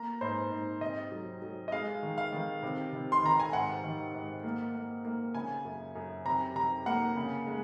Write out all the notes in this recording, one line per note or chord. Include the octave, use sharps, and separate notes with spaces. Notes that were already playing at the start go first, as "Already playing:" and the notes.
Already playing: A#3 A#5
G#2 C5
G#2
C3 D#5
F#3
F#3
D#5
G#3 F5
D#3
F5
D#3
C3
C3
C6
D#3 A#5
G#5
G#2 F#5
D#3
G#2
A#3
A#3
A#3
C#3 G#5
F#2
F#2
C3 A#5
C3 A#5
A#3 F#5
C#3
G#3